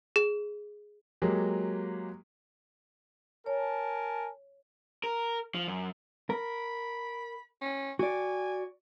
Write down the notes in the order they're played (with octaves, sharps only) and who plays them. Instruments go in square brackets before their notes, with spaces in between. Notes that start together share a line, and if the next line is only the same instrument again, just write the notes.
[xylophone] G#4
[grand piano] F#3 G#3 A#3 G4
[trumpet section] A#4 G#5 A5 [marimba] C#5
[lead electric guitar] A#4
F3
F#2
[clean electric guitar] A#4 [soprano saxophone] B5
[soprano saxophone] C#4
[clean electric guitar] F#4 D5 [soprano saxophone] G#5